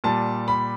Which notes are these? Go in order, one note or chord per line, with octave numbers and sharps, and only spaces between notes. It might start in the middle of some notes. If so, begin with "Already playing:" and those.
A#2 G3 A5
B5